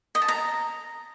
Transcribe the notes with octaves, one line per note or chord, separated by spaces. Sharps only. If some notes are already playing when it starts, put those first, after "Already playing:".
D#5
A5
A#5